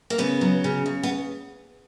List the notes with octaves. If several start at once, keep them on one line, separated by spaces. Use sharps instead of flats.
A#3
C#3 B3
F#3
C#3
C#3
B3